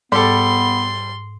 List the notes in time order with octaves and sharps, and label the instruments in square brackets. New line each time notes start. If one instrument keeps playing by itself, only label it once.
[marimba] G#2 [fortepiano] G3 A4 [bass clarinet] B3 [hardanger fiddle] C6